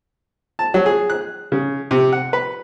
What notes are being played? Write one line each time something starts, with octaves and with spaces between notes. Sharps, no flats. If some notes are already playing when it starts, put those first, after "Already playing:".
A5
F#3
G#4
F#6
C#3
C3
F#5
B4